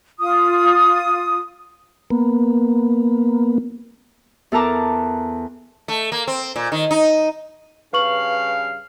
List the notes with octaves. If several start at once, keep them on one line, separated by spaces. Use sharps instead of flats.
F4 D#6
A#3 B3
E2 A4 A#4 A5 A#5 D6
A3
A#3
C4
A#2
D#3
D#4
G2 C#3 B4 F5 C#6 F#7